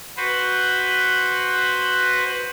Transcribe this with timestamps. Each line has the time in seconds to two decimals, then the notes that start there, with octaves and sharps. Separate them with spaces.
0.17 F#4 B4 C5